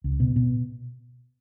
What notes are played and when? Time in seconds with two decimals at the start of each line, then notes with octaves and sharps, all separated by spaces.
0.04 C#2
0.20 B2
0.36 B2